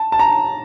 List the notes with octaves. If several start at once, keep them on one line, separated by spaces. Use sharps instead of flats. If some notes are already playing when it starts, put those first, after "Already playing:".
Already playing: A5
A5
A#5